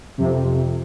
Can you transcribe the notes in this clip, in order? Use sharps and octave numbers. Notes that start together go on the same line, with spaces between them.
F2 C3